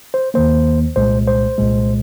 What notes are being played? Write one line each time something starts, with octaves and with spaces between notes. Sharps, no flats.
C5
D#2 D#3 A#3 C5
C2 A#2 G#3 C5
C5
C2 A#2 G#3